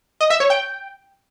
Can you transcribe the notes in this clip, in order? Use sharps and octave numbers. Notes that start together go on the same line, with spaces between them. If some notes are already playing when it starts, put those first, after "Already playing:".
D#5
E5
C#5
G5